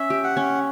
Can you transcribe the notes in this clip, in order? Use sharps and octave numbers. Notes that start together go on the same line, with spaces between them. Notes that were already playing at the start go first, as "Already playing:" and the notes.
Already playing: C#4 E5
G4
F#5
C#4